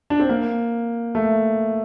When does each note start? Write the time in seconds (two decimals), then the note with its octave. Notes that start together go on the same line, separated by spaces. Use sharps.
0.10 D4
0.20 C4
0.29 A#3
1.15 A3